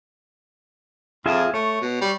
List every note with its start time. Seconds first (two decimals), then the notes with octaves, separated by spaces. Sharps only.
1.26 F2 F4 G#4 E5
1.54 A3 C#5
1.81 B2
2.01 G3